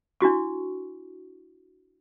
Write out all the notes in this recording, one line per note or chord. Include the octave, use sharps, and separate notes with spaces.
D4 E4 F#4 C#6